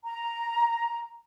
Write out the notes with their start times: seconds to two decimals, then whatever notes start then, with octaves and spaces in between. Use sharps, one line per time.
0.05 A#5